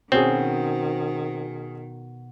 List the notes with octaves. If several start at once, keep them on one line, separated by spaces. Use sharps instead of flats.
B2 D#3 C4 C#4 G#4